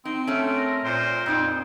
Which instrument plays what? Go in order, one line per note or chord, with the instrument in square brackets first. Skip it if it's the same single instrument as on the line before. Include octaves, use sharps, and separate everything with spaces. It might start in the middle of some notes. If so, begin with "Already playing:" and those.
[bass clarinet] C4 [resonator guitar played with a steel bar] D#4
[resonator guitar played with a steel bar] A3 C#4 [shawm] E5
[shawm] A#4
[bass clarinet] A#2 [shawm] C5
[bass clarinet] F2 [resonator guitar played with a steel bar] A#2 D#4 [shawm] G5